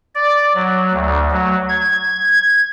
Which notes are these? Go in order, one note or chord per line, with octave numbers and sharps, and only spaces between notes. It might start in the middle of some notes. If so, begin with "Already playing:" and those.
D5
F#3
D2
F#3
G#6